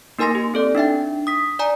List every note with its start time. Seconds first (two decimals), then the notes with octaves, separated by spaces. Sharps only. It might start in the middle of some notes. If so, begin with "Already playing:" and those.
0.19 A#3 D#4 A#4 G#5 C6 A#6
0.35 G4
0.54 C4 A4 D5
0.75 D4 D#4 E5 G5
1.27 D#6 B6
1.59 D5 G#5 A#5